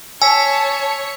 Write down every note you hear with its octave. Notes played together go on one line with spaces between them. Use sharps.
C#5 G#5 A5 E6 B6